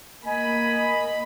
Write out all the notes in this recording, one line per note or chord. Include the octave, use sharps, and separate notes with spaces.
A#3 D#5 G#5 B5